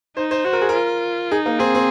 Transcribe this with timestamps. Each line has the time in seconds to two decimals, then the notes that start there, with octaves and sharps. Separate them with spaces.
0.17 D#4 C5
0.31 C5
0.45 F#4 C5
0.53 A#4
0.61 G#4
0.69 A#4
0.74 F4
1.31 D#4 G#4
1.46 A#3
1.59 C4 G#4
1.75 C4